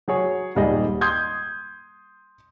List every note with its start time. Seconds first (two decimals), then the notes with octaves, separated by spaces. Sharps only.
0.08 F#3 G#4 C#5
0.55 D#1 G#2 G3 G#4 D#5
1.01 C6 D#6 G6 G#6